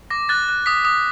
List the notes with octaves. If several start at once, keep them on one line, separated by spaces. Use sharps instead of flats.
D6 A#6
F#6 A6
F#6
D#6 B6
D#6